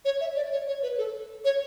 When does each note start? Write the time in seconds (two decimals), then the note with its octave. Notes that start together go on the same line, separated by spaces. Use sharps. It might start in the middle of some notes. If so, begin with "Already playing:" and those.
0.05 C#5
0.21 E5
0.36 D5
0.52 C#5
0.67 C#5
0.83 B4
0.98 A4
1.45 C#5